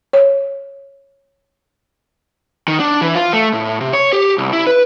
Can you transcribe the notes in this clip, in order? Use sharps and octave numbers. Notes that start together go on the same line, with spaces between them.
C#5
D#3
D4
E3
F4
A3
A2
C3
C#5
G4
C2
E4
B4